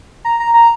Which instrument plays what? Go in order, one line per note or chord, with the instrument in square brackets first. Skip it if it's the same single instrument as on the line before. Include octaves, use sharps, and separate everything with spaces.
[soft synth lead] A#5
A#5
A#5